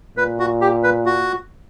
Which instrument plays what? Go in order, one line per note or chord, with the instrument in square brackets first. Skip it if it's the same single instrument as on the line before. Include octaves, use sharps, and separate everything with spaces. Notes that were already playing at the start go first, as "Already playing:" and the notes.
[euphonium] A#2 [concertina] B4
[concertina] F#4
G4
B4
F#4